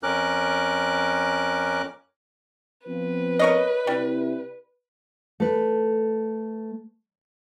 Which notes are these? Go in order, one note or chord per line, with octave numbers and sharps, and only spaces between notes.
F2 C#4 A#4 D6 F#6
F3 B3 C4 B4
A#4 C#5 D#5
C3 G3 C4 E4
A3 B4